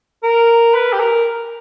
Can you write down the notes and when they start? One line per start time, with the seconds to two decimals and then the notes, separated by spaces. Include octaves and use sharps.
0.23 A#4
0.74 B4
0.93 G4
0.99 A#4